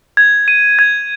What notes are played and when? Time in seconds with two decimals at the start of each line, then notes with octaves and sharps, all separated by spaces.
0.17 G#6
0.48 D#7
0.79 G#6